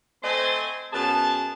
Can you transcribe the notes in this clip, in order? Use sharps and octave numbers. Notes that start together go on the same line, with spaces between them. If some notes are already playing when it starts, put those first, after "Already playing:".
A3 C4 C5 D#5 G#5 C6
F#2 B3 G#4 A5